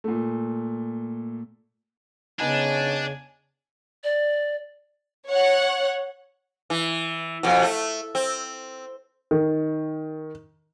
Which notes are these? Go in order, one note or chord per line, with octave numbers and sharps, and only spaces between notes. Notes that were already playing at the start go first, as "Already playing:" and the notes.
A#2 A3
C#3 B3 D4 D#4 G#5
D5
C#5 F#5
E3
F2 B2
A3
C4
D#3